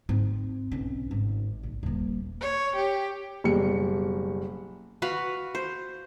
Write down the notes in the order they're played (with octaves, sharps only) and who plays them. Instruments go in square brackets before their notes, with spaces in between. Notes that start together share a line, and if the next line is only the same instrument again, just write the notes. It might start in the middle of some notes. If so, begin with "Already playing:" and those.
[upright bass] G#2 C4
B1 C#4
G#1
A#1
D#1 A#3
[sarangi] C#5
G4
[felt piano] F#1 B2 G3 C#7
[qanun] F#4 B4 F5
C5